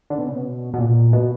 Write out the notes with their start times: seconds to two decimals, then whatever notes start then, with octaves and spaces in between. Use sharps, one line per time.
0.10 D3
0.18 B2
0.27 C#3
0.36 B2
0.74 B2
0.79 A#2
1.13 B2